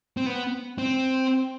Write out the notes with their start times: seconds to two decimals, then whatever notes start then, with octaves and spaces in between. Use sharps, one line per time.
0.17 C4
0.26 B3
0.78 C4